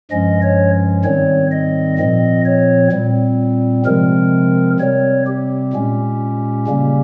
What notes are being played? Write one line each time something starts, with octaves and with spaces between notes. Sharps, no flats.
G2 F3 G#3 C#4 D#5
C#5
G#2 D#3 G3 C4 C#5
D#5
A#2 F3 C4 D#5
C#5
A#2 G3 C4
C3 F3 G#3 C4 A#4
C3 G3 C4 C#5
G4
A#2 G#3 C#4
C#3 G3 A#3 C#4